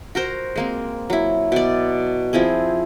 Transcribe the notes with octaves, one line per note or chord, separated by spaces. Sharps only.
F#4 A#4 C5
G#3 A#3 C4
F#3 E4
B2 D5
F3 C4 E4 G#4